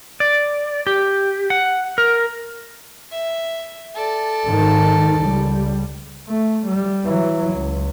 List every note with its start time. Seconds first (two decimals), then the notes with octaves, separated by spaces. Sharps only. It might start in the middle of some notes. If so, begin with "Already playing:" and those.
0.20 D5
0.87 G4
1.50 F#5
1.98 A#4
3.11 E5
3.95 A4 D5
4.46 G#2 D#3
5.23 C#2 G3
6.28 A3
6.66 G3
7.05 E3 F#3
7.55 C#2